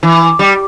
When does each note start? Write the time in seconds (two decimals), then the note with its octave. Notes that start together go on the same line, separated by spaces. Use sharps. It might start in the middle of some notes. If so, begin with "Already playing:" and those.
0.03 E3
0.39 G3